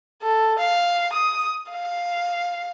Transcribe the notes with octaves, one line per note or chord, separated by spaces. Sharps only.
A4
F5
D#6
F5